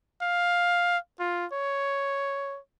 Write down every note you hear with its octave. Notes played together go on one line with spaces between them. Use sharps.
F5
F4
C#5